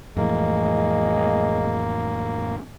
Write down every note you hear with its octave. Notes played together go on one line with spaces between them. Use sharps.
F2 A2 E3 G#3 A#3